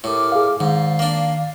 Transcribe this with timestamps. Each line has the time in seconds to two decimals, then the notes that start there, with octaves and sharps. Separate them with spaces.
0.04 A2 G4 A#4 D6
0.32 G#4 F5
0.60 G#2 D#3 D5 F5
0.99 A#3 D4